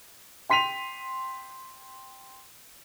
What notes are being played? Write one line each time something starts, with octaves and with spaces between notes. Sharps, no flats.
G5 C6 B6 D#7 F7